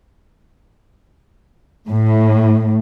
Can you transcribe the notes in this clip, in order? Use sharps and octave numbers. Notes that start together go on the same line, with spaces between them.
A2